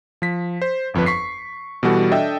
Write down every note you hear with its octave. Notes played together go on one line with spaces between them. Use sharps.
F3 B6
C5
G1 F2 F3 B4
C#6 B6 C7
B2 E3 G3 F#4 A4
D4 A4 D#5 E5 G5